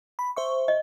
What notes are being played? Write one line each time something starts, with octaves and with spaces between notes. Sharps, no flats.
B5
C5 E5 C#6
D#5